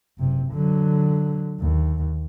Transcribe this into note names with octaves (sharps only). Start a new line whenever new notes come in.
F#1 C3
D3 F#3
D#2